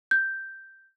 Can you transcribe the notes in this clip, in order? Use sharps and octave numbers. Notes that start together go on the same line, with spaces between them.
G6